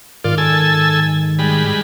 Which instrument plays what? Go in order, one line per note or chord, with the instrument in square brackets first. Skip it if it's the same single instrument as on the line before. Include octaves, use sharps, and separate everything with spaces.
[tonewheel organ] G#2 D#3 [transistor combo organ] F4 D5
[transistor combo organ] A4 G#5 E6
G3 G#3 B5